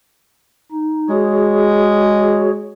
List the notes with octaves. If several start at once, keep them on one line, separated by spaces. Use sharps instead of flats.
D#4
G#3 F#4 G#4 C#5